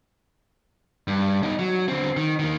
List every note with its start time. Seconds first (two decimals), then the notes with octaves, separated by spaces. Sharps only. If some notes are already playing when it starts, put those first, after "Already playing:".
1.08 G2
1.43 E2 D#4
1.59 F#3
1.88 D3 C4
2.17 D#3
2.39 D#3 A#3